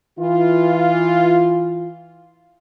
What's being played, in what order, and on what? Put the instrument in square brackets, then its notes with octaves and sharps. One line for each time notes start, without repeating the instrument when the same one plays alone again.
[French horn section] E3 F4